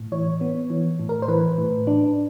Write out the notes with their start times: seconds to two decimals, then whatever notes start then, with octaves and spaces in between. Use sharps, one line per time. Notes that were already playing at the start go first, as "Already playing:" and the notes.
Already playing: A2
0.12 E3 C#5
0.41 B3
0.70 E3
0.99 A2
1.09 A#4
1.22 C5
1.28 E3 B4
1.58 A2
1.87 D4